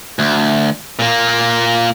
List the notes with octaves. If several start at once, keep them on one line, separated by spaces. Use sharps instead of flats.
D2
A#2 A#3